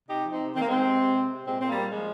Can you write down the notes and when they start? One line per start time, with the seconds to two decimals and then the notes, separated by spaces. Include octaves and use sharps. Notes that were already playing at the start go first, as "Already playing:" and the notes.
0.09 C3 D#4 G4
0.24 F3
0.32 C4 D#4
0.39 C3
0.55 D#3 C4
0.62 A#3
0.68 D#3 G#3 C4
0.85 C3
1.00 C3
1.16 C3
1.31 C3
1.46 A#2 G#3 C4
1.60 A#2 C4
1.69 G3 A#3
1.76 A#2
1.91 F3 G#3